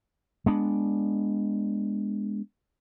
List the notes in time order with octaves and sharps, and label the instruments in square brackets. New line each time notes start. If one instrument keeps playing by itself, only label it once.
[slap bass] G#3 B3 D4